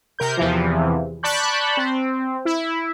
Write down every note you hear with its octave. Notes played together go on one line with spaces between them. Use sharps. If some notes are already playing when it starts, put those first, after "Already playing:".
C3 A#4 G6
E2 C3 E3 F3
D5 A5 B5 C#6 F#6 G6
C4
E4